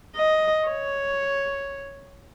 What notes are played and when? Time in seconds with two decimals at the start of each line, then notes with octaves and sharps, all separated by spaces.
0.16 D#5
0.68 C#5